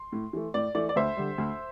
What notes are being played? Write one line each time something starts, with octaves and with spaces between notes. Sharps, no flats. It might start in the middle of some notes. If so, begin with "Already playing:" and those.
Already playing: C6
A2
E3 A3
A2 D5
E3 A3 D5
D5
D2 C5 E5
D3 G3
D2